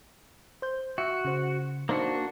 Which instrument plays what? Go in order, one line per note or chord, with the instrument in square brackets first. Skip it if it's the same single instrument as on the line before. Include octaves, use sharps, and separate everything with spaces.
[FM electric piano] C5 G6
[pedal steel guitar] F#4 [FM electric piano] E5
[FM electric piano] C#3 C5
[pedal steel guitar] A#3 D4 F#4 [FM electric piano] D#4 C5
[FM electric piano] A#4